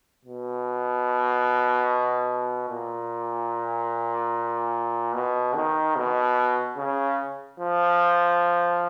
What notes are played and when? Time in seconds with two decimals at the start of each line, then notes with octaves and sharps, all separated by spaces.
0.25 B2
2.69 A#2
5.15 B2
5.55 D#3
5.96 B2
6.77 C#3
7.60 F3